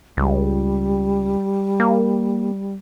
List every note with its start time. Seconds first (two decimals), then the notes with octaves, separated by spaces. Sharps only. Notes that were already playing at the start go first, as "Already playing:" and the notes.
0.17 C#2 G3
1.80 A#3